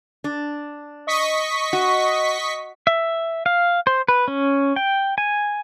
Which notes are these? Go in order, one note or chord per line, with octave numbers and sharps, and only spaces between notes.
D4
D#5 C#6 B6
F#4
E5
F5
C5
B4
C#4
G5
G#5